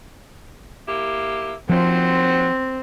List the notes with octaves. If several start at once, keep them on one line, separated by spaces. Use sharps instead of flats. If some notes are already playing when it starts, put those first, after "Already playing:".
A#3 E4 G4
D#2 F3 F#3 C4 C5